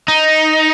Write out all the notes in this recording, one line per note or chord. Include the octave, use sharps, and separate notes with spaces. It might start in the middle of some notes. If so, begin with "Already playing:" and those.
D#4